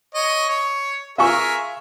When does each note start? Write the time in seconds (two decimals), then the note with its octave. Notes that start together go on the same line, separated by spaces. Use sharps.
0.15 C#5 D#5
0.49 C#5
1.18 F4 G#4 A#4 E5 G#5 C#6